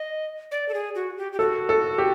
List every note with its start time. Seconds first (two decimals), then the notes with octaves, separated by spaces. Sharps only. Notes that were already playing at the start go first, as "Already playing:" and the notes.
Already playing: D#5
0.51 D5
0.69 A4
0.74 G#4
0.95 F#4
1.18 G4
1.33 G4
1.39 F#4 A4
1.69 A4
1.98 G4